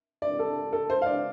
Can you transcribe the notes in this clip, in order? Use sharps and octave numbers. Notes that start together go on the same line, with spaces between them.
D5
A4
A4
C5
F5
D5